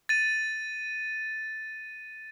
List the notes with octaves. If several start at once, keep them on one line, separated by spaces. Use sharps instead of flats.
A6 D#7